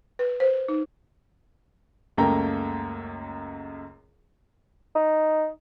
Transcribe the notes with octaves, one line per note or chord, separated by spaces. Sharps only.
B4
C5
D#4
C#2 F#2 A3 A#3 G5 A#5
D#4